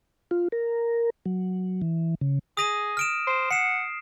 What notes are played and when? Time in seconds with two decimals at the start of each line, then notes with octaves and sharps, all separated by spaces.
0.31 F4
0.52 A#4
1.26 F#3
1.82 E3
2.21 C#3
2.57 G#4 D#6 A#6 D#7
2.97 F6 D7 E7
3.27 C5
3.50 F#5 C7 E7